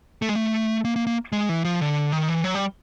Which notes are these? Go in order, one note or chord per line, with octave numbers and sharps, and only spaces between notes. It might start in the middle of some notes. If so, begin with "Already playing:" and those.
A3
G#3
A3
A#3
A#3
A#3
G#3
E3
F3
D3
D#3
E3
F#3
G3